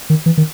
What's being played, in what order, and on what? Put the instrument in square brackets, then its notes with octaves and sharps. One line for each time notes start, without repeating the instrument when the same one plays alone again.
[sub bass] D#3
E3
D#3